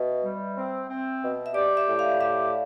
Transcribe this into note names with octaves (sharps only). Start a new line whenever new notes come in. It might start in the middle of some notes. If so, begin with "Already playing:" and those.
Already playing: B2 E5
G3
C4
C4
B2
E5
G4 D5
E5
A2
F5
G4 E5